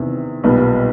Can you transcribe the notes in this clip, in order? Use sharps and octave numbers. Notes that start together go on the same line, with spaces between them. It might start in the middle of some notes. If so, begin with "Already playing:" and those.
Already playing: E2 C3 D#3
B1 A#2 G3 B3